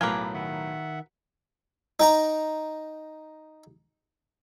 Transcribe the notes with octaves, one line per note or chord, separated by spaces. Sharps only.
B1 A2 F4 A#4 B4 G#5 D6
D#3 E5 F#5
D#4 G5 A#5